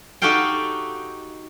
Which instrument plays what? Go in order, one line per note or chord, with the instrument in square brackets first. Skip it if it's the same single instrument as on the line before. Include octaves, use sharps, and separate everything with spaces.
[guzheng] D#4 F#4 G4 A4 F5 G5